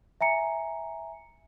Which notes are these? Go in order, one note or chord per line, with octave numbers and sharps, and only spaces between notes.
E5 G#5 A#5 C#7